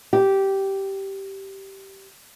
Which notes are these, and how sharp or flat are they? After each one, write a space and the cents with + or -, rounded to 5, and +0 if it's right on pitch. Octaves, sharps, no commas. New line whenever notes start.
G4 -10